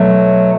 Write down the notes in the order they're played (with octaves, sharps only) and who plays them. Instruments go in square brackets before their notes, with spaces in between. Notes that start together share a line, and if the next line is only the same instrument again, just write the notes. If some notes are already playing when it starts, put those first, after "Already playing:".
Already playing: [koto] B2 A3 [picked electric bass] F#3